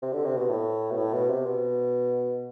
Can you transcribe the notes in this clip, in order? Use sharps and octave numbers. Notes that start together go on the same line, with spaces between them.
C3
D3
C3
B2
A2
B2
A2
B2
C3
B2